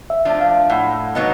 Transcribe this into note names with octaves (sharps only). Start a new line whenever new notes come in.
E5
F3 A3 D4
F5
A2 F#5
F#3 B3 D#4